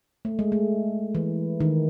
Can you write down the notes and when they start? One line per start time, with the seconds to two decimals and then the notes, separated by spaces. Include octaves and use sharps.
0.25 A3
0.39 G#3
0.52 A3
1.15 E3
1.60 D#3